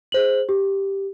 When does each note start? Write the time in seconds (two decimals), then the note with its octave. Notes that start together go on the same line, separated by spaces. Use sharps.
0.12 G#4 C5 F#7
0.49 G4